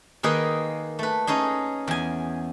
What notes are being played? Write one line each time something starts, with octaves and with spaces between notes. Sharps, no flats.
D#3 A#3 D#4 G#4 B4 D#5
A3 B4
C#4 D#4 G#4 D#5
E2 G#5